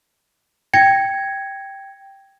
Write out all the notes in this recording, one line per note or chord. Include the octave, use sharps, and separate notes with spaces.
G5 G#6 A#6 C#7